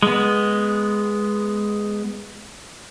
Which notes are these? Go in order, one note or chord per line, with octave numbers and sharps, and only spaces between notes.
G#3 B3